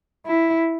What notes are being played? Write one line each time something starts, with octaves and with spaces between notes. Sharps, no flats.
E4